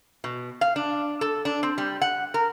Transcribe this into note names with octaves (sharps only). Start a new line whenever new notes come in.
B2
F5
D4
A4
D4
C4
G3
F#5
A#4